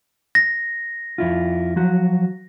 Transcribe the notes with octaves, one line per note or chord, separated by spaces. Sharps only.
A#6
F2 E4 F4
F3 F#3 F#4